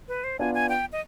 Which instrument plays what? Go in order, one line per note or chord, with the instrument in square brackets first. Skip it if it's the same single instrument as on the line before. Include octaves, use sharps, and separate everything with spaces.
[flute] B4
C5
[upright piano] B3 D4 F4 [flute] G#5
[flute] G#5
G5
D#5